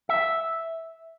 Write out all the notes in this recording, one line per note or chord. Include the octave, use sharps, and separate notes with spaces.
E5